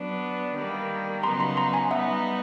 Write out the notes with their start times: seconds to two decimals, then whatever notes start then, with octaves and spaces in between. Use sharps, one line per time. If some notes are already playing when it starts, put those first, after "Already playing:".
Already playing: F#3 B3 D4
0.54 D#3 G3 A#3
1.23 C#3 F#3 B3 D#4 A#5 C6
1.40 A#5 C6
1.57 A#5 C6
1.74 G#5 A#5
1.91 G3 B3 D#4 E5 F#5